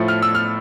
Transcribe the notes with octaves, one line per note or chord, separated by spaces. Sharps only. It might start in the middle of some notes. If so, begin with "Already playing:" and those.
Already playing: A2 F3 A3
F6
E6
F6